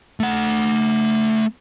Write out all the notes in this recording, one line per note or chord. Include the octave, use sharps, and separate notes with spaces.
A3 F#5